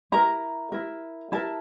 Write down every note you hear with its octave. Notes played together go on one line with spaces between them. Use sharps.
E4 A#4 A#5
E4 A#4
E4 A#4 A5